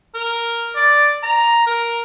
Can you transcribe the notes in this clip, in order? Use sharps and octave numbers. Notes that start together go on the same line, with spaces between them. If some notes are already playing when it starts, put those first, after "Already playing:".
A#4
D5
A#5
A#4